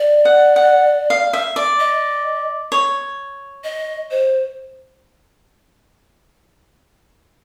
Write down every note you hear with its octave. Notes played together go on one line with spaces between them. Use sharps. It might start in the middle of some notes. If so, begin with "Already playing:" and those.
Already playing: D5
F#5
F#5
F5
E5
D5
D#5
C#5
D#5
C5